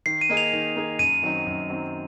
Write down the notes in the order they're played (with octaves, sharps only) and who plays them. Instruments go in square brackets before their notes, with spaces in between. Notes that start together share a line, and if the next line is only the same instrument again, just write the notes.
[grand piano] D#3 [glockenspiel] C7
[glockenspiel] D#7
[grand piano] A#3 D#4 G#4
[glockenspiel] F7
[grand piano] D#3
A#3 D#4 G#4
[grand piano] F#2 [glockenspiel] D#7
[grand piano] D#3 F#3 C4 D#4
F#2
D#3 F#3 C4 D#4